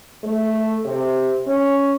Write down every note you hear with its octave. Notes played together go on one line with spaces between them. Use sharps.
A3
C3
C#4